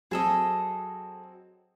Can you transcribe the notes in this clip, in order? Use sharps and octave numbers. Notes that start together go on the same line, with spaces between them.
F#3 C4 G#4 A4 D#5